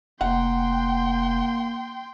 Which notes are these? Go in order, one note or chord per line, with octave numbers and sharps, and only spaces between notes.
F1 A#3 F#5 G5 C6